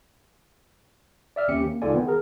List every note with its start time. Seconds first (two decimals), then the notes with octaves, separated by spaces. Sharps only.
1.36 D5 E5 F6
1.48 D#2 C4 C#4 G4 C#7
1.64 A#3
1.82 C#2 D#4 F4 A4 D5 G#5
1.94 D#3 B3 G5
2.07 G#4 A#4